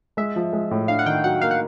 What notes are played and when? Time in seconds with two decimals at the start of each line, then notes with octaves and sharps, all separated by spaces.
0.17 G#3 E5
0.36 F3
0.53 G#3
0.71 A2
0.88 D4 F5
0.99 F#5
1.06 D#3 G5
1.24 F#3 F#5
1.41 A#3 F5
1.51 F#5